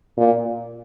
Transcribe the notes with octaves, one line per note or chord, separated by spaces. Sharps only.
A#2